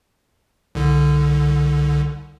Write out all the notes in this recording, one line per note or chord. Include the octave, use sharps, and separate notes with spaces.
C2 D3